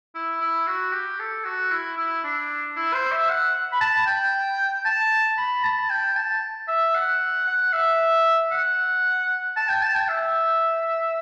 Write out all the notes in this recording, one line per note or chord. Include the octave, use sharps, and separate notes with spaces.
E4
E4
F#4
G4
A4
F#4
E4
E4
D4
E4
C5
E5
F#5
B5
A5
G5
A5
B5
A5
G5
A5
E5
F#5
F#5
E5
F#5
A5
G5
A5
G5
E5